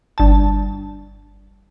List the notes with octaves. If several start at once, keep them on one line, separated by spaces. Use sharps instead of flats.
G1 A5